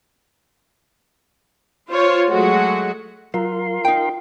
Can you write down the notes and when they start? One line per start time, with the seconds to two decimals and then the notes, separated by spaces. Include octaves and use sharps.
1.90 F4 C5 C#5
2.30 F#3 G#3 A3 F#4
3.34 F#3 F4 A#4 C6
3.85 D#4 G5